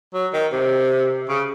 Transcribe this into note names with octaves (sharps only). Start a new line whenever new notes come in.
F#3
D#3
C3
C#3